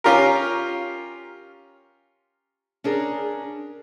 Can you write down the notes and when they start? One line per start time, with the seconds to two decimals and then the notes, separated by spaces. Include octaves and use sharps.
0.04 C#4 F4 G4 A#4
2.84 C#4 D4 G#4 A#4